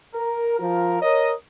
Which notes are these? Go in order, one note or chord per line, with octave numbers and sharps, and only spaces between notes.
A#4
F3 F4 A#4
A#4 C#5 D#5